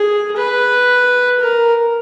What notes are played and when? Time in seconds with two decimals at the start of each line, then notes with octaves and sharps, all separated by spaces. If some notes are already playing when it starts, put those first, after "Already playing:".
Already playing: G#4
0.37 B4
1.40 A#4